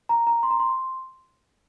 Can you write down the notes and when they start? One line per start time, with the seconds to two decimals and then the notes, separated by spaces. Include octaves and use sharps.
0.09 A#5
0.27 A#5
0.43 C6
0.51 A#5
0.60 C6